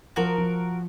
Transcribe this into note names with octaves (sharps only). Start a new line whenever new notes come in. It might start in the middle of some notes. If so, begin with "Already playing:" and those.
F3 F#4 A#4
F3